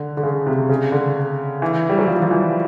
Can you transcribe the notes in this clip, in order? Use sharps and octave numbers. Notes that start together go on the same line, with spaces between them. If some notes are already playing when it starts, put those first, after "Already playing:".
Already playing: D3
D3
C#3
C3
C#3
D3
E3
G3
F#3
F3
F3
E3